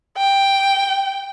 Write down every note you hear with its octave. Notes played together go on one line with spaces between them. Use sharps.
G5